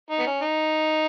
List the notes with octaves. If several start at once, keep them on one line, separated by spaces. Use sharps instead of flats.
D#4
B3
C#4
D#4